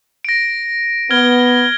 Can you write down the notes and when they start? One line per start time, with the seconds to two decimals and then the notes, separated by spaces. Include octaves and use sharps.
0.25 A#6 D7
1.11 B3 F6 G#6 G7